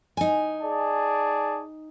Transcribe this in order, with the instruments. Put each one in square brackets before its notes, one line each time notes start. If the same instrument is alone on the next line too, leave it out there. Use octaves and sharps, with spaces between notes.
[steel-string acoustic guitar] D#4 G#5
[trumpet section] G#4 D5 A5